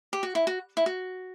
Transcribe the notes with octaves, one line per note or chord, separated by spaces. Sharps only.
G4
F#4
E4
F#4
E4
F#4